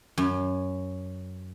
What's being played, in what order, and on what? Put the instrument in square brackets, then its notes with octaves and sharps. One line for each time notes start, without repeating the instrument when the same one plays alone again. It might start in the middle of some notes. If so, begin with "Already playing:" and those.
[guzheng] F#2